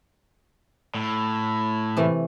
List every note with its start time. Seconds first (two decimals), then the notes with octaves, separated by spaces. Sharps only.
0.94 A2
1.97 C3 E3 A3